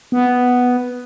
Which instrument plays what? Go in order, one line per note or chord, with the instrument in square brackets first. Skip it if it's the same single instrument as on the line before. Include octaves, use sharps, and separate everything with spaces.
[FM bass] B3